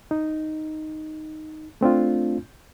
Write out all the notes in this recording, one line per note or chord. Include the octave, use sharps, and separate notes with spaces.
D#4
A3 C4 D4 F4